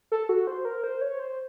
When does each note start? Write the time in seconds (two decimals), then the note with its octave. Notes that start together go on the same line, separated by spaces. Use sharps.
0.12 A4
0.29 F#4
0.47 C5
0.65 A#4
0.84 C5
1.01 C#5
1.19 C5